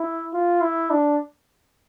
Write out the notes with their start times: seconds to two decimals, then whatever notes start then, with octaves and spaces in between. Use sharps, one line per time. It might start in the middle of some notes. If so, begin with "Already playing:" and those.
Already playing: E4
0.33 F4
0.62 E4
0.90 D4